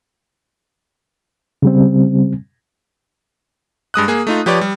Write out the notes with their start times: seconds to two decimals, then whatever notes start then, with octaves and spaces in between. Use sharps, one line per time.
1.62 C#3 G3 C4
3.94 G2 G#3 D#6 F#6
4.08 A#3 G#4
4.27 A3 D#4 F4
4.46 F3 G4 B4 C#5 D5
4.61 G3